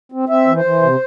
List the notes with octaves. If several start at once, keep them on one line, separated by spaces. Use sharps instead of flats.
C4
C4 E5
E3
C5
E3
C3